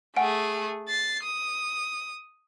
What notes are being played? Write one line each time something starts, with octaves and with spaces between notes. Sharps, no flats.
A3 G#4 F#5 G#5 D7
A6 C7
D#6